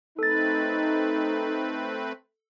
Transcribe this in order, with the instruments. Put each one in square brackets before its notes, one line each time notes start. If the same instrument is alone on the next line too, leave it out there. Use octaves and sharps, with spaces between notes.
[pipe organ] A3 C4 B4 [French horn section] D#4 [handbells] A4 A6